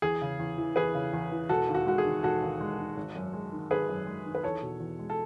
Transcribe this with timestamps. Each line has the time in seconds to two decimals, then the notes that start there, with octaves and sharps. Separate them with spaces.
0.02 E2 G#4
0.22 C#3
0.39 E2
0.58 E3
0.76 E2 G#4 B4
0.95 C#3
1.13 E2
1.32 E3
1.49 E1 F#4 A4
1.69 D#2
1.74 F#4
1.86 G#3 F#4
1.98 G#4
2.04 D#3
2.23 E1 F#4 A4
2.42 D#2
2.61 G#3
2.79 D#3
2.97 G#1
3.16 F#2
3.33 G#3
3.52 D#3
3.70 G#1 G#4 B4
3.89 F#2
4.07 G#3
4.26 D#3
4.35 B4
4.43 E2 A4 C#5
4.62 B2
4.80 E2
4.99 G#3
5.10 A4